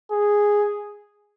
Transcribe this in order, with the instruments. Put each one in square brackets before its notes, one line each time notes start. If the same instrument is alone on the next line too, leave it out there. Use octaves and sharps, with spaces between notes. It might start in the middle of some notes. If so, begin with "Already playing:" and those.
[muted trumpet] G#4